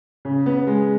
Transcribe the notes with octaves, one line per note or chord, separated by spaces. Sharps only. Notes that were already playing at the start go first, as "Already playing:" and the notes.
C#3
B3
G#3